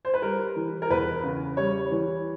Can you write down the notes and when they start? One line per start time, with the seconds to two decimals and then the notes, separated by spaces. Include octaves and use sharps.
0.05 C5
0.14 B4
0.22 G3 A#4
0.56 E3
0.82 A#4
0.90 E2 B4
1.23 C#3
1.57 G3 C#5
1.91 E3